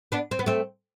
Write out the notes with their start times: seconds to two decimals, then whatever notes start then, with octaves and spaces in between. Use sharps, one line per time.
0.12 B3 D4
0.31 C4
0.39 B3
0.46 A3 C4